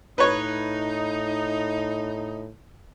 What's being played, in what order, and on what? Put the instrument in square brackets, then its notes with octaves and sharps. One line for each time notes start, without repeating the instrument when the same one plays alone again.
[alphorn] A2 [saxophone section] D#4 [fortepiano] B4 C#5